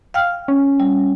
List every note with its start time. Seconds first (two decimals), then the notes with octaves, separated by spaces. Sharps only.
0.14 F5 G5 F6
0.48 C#4
0.80 G3